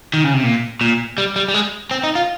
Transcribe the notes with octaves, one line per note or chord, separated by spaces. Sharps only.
D#3
C#3
C3
A#2
A#2
G3
G3
G3
G#3
C4
D#4
F4